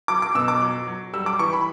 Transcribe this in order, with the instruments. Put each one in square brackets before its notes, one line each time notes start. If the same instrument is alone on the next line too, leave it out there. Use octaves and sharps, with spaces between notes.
[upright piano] F#3 D6
D6
B2 E6
D6
F#3
F#3
G3 E6
D6
E3 C#6
B5